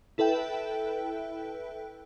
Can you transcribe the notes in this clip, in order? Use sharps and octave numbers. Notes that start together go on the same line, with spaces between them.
E4 A4 B4 E5 G5